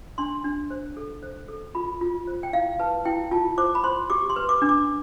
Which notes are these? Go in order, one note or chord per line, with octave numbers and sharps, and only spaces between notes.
D4 C6
D4
C5
A4
C5
A4
F4 B5
F4
C5
G5
E4 F5
B4 A5
E4 G5
F4 A5
C5 D6
B5
C5 C6
G4 D6
C6
B4
D6
D4
D6